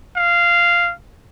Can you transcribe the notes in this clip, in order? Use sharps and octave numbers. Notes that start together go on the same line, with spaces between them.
F5